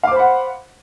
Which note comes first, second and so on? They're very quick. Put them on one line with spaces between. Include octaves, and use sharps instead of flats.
F5 D6 C5 B5 F#5